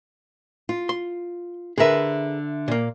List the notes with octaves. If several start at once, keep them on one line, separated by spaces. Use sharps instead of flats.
F4
C6
D3 G#4 A#4 B4 E5
A#2 A#3